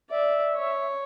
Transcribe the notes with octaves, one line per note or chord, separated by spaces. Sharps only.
D5 E5
C#5